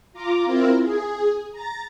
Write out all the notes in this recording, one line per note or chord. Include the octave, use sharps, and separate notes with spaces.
F4 A#5 D6
C4 E4 F4 A#4
G#4
A#5 A6